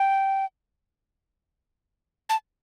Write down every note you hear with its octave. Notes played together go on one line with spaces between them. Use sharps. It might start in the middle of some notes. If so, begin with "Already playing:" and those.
Already playing: G5
A5